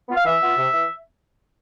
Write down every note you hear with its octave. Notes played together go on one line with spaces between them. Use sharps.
B3 F4
F5
E3 E5
B3 F4
C3
E3